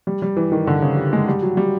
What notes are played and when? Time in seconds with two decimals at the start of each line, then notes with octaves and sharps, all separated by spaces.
0.07 G3
0.22 G3
0.36 E3
0.52 D#3
0.67 D3
0.82 C#3
0.97 G3
1.13 G#3
1.28 G3
1.42 F#3
1.57 G3